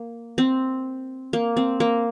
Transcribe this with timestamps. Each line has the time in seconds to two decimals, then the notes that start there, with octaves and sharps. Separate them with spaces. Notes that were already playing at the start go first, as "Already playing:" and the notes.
Already playing: A#3
0.38 C4
1.33 A#3
1.57 C4
1.80 A#3